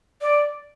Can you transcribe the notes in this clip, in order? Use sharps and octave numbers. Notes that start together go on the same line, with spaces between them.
D5